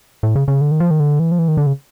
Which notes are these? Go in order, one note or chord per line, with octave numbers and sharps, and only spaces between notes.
A2
C#3
C#3
D3
D#3
F3
D#3
D3
E3
F3
E3
D#3
D3
C#3